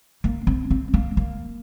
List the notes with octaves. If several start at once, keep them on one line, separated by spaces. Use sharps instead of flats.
A#3
C4
C4
A#3
A#3